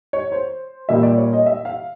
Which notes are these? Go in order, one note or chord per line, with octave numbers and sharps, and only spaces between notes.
C#5
C5
A#2 G3 A#3 E5
D5
C#5
D#5
E5
F5